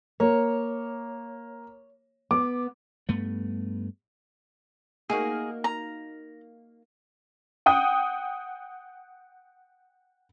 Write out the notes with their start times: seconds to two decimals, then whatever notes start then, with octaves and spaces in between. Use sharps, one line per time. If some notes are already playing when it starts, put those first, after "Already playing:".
0.20 A#3 C#5
2.31 B3 D6
3.09 G2 A3 B3
5.10 A#3 D#4 F#4 G#4
5.64 A#5
7.66 F#5 G5 D#6